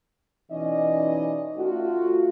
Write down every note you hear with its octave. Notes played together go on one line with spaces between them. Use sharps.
B2 E3 C#4 D#4 D5 D#5
A3 F4 F#4